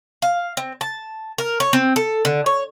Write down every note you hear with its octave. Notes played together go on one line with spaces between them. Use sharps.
F5
C4
A5
A#4
C#5
C4
A4
D3
C#5